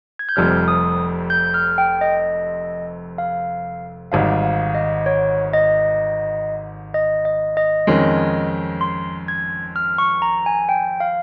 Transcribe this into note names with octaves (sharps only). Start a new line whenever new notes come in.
G#6
G6
F1 F2 C3 G3 F6
D#6
G6
F6
G5
D#5
F5
G#1 G#2 G3 F5
F5
D#5
C#5
D#5
D#5
D#5
D#5
F2 D#3 G#3 C#4
C6
G#6
F6
C#6
A#5
G#5
G5
F5